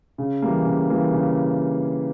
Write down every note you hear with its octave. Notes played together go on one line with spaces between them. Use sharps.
C#3
E3 G3 A#3
C#3
E3 G3 A#3
C#3